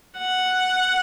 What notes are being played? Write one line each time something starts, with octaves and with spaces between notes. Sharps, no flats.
F#5